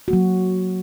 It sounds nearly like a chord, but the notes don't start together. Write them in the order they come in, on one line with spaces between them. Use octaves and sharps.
F#4 A#3 F#3